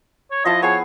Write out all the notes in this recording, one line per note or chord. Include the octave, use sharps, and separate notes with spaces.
C#5
F3 E4 D#5 A5
B3 G#4 C#5